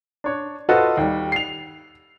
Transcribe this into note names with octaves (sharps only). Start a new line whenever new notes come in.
D4 C#5
F4 F#4 A4 B4 C5 D#5
D#2 G3
C7 F7